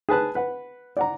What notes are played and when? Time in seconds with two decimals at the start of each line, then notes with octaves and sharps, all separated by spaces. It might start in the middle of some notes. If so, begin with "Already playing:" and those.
0.09 G#4 B4 A5 F#6
0.35 B4 F#5
0.97 D5 F#5 A#5